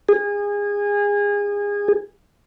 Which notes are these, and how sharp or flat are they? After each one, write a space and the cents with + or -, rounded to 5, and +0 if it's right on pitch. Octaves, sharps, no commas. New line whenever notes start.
G#4 -25